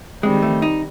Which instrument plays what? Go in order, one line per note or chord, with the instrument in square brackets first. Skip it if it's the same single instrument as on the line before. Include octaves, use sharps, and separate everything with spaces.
[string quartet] D#3 G3 C4 [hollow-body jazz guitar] G#3
[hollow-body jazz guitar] A3
D#4